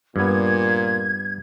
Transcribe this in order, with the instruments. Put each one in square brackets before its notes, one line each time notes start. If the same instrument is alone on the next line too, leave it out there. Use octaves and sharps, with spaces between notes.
[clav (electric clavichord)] G2 B3 [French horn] A#2 [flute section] G#6